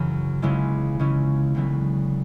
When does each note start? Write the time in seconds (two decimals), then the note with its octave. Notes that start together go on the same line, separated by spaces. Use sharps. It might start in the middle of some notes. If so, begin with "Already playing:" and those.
Already playing: F#2 C#3 E3
0.42 C#2 C#3 G#3 B3 E4
0.99 C#3 G#3 C#4 E4
1.55 D2 C#3 F#3 B3 E4